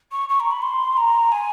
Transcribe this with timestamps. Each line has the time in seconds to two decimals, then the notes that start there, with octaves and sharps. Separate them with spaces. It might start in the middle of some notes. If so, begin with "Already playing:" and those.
0.12 C#6
0.29 C#6
0.40 A#5
0.51 B5
0.62 C6
0.97 A#5
1.32 G#5